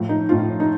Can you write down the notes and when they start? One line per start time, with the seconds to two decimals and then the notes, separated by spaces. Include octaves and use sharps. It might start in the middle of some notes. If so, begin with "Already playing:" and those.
Already playing: A2 F3
0.09 D#4
0.29 A2 F3 F4
0.60 D#4